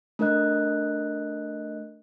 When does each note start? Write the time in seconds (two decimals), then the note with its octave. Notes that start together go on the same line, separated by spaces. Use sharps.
0.19 A3 D4 A#4 D#5 F#6